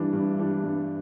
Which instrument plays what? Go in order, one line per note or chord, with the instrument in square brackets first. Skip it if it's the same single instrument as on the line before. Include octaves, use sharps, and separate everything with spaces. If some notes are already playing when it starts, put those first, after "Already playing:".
Already playing: [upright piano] G2 E3 G3 D4
G2
E3 G3 D4
G2